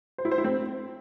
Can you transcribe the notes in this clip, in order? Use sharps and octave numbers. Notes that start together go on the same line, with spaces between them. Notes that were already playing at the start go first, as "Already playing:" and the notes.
C5
E4
C5
E4
C4